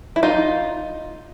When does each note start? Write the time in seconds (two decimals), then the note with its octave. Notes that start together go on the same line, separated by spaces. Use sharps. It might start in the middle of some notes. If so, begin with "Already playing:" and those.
0.16 E4
0.23 D#4 F4